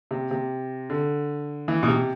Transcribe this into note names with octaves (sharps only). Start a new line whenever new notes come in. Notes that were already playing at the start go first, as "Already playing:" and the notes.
C3
C3
D3
E3
B2
C3